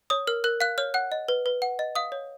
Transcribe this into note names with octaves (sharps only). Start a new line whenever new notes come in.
C#5 D#6
A#4 F6
A#4 F#6
F5 F#6
C#5 F6
F#5 F#6
D#5
B4
B4
F#5
D#5
F5 D#6
C#5